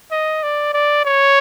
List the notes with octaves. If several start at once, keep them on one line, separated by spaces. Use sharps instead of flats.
D#5
D5
D5
C#5